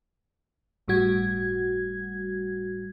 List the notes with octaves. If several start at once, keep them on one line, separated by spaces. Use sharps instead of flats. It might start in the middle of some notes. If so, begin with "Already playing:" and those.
G1 A2 G3 F#4 G#6